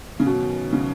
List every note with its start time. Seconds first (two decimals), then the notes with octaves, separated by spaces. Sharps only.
0.20 C#3
0.26 F#2 B2 D#3 F#3 C#4
0.73 C#3